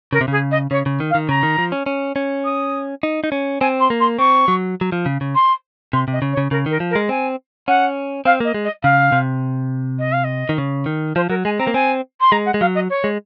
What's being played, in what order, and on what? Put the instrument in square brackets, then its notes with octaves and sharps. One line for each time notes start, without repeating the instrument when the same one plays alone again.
[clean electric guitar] C#3 [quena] A#4
[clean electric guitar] C3
[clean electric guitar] C#3 [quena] G#4
[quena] D#5
[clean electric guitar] C#3 [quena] C#5
[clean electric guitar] C#3
D#3
[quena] F5
[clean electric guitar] D#3
[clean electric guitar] C#3 [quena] A#5
[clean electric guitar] D#3
F3
C#4
C#4
C#4
[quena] D#6
[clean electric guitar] D#4
D#4
C#4
[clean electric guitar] C4 [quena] G#5
[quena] C6
[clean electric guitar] A#3
[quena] C6
[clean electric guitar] C4 [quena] C#6
[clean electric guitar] F#3
F#3
F3
C#3
C#3
[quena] C6
[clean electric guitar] C3 [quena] C6
[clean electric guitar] C3
[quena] D#5
[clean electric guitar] C#3
[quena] C#5
[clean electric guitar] C#3
[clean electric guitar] C#3 [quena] A#4
[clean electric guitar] D#3 [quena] A#4
[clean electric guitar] F3
[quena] A#4
[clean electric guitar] G#3
[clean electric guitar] C4 [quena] G#5
[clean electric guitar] C#4 [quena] F#5
[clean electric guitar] C4 [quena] F5
[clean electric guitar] A#3 [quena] D#5
[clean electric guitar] G#3
[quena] D#5
[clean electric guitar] C#3 [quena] F5
[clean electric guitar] C3
[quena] D#5
F5
D#5
[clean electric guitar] D#3
C#3
D#3
[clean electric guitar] F3 [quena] C5
[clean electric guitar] F#3 [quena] A#4
[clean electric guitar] G#3 [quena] G#5
[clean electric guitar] C4 [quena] A#5
[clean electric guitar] A#3
[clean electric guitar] C4 [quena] G#5
[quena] C6
[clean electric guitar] G#3 [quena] A#5
[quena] F#5
[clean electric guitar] G#3
[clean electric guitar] F#3 [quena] F5
[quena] D#5
C#5
[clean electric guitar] G#3